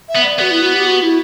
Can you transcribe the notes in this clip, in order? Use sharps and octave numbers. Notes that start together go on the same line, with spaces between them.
E5
B3
D5
B3 F#4
E4
F#4
G4
F#4
E4